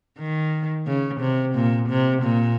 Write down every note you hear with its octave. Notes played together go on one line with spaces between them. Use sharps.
D#3
C#3
C3
A#2
C3
A#2